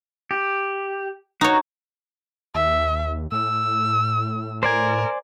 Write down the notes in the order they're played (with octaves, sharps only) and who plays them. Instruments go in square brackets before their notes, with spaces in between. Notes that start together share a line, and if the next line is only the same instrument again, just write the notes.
[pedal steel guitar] G4
[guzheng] D#4 C#5 [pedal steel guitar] F#4
[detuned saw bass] D#2 [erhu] E5
[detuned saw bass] A2 [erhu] E6
[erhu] A#4 [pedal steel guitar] C5 D5 G#5